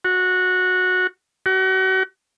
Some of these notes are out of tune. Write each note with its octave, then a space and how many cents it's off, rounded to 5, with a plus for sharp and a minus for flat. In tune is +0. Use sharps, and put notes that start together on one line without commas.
F#4 -15
F#4 +35